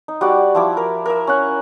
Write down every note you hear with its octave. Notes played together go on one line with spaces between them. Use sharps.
D#4
G3 F#4 D5
F3 E4 D6
A#4
A#4 E5
C#4 F#5